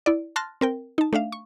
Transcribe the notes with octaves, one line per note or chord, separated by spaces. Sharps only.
E4 D5
A5 C6 F6 F#6 A6 A#6
C4 A#4 G5
D#4 A5
A3 D4 E5 F5
C#6